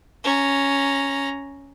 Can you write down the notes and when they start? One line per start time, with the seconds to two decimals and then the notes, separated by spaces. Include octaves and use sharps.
0.24 C#4 A#5